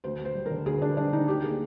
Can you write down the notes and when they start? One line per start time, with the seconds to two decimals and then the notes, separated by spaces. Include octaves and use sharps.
0.04 D2 C5
0.19 D2
0.25 C5
0.35 G3
0.46 A#4
0.50 D3
0.66 D2 G#4
0.82 D2 D4
0.97 G3 D4
1.13 D3 D#4
1.28 D2 G4
1.43 A#3 G#4